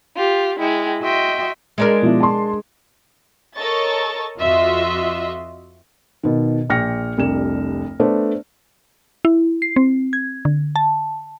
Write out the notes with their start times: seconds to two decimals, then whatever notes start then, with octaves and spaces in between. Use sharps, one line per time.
0.16 F4 G4
0.59 G#3 E4 G5
1.01 F#4 D#5 E5 G5 C6
1.78 G#3 D4 A#4
2.02 B2 F3 E4
2.20 A5 C6
3.56 A4 A#4 C#5 D#5 C#6 A6
4.40 F2 F4 F#4 D#5 E5 C6
6.23 B2 D#3
6.69 A#1 G5 F6 A#6 C#7
7.17 F1 C2 D4 E7
8.00 A3 B3 D4 A4 C5 D5
9.25 E4
9.62 C7
9.76 C4
10.13 G#6
10.45 D3
10.76 A5